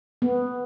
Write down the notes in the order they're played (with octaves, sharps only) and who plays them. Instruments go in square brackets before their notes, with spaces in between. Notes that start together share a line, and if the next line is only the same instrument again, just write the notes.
[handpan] B3